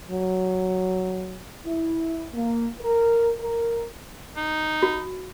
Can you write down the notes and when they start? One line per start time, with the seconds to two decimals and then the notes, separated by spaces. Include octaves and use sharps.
0.10 F#3
1.65 E4
2.34 A#3
2.80 A#4
3.39 A#4
4.36 D#4
4.83 F#4